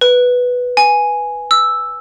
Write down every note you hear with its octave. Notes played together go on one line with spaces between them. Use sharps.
B4
G#5
E6